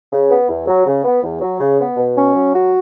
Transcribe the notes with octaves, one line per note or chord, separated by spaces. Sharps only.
C#3
B3
E2
F#3
C#3
B3
E2
F#3
C#3
B3
B2
C#4
F#3
F#4